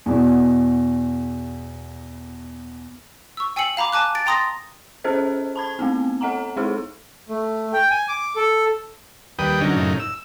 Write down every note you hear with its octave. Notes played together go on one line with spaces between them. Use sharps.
E2 B2
C#6 E6
G5 G#5 E6 C7 C#7 F#7
F5 A#5 B5 D6
G#5 A5 D6 F#6
A6 D7
G5 A#5 C6 D#6 A6 A#6
C#4 G#4 A4 C5 D#5
A5 B5 G#6
A3 B3 C4
A4 D#5 F#5 G#5 A#5
G#3 D#4 E4 G#4 A4
A3
G5
G#5
D6
A4
D#2 G3 B4 G5 D#6
D3 F#3 C#4 D#4
F#2 A2 C#3 D#4
E6